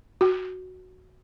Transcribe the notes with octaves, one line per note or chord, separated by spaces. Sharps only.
F#4